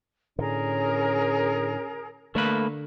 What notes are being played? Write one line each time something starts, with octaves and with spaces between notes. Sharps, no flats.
A2 D3 C#4 G#4 A#4
D3 A3 A#3 B4